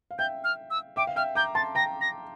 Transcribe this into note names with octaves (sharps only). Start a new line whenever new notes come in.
F5
E5 G5 G6
F6
E6
E5 G5 D6
F5
E5 G5 F6
A#5 D6 G6
A5 C6 A6
G5 A#5 A#6
A#6